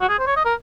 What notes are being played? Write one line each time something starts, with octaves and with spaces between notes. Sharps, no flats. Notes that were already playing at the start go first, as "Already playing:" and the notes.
F#4
G#4
C5
C#5
D#5
A#4